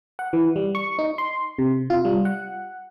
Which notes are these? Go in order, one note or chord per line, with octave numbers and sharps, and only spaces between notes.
F#5
E3
G3
C#6
D#4
C6
C3
F4
G3
F#5